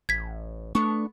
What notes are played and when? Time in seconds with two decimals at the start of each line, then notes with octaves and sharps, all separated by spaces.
0.09 A1 G#6 B6
0.75 A3 B3 D4 C#6